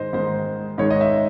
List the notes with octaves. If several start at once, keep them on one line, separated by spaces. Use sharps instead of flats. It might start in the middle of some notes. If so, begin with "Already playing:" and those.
Already playing: G#2 D#3 G#3 C5 D#5
G#2 D#3 G#3 C5
G#2 D#3 G#3 C#5
D#5
E5